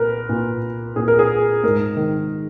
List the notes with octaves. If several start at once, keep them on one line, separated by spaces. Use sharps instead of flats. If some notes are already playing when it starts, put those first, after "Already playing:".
Already playing: A#2 A#4 B4
A#2
A#2 G#4
A#4
G#4
G#2 A#4
D#3